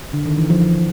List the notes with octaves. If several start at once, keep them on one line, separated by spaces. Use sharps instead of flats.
D3
D#3
E3
F3
F3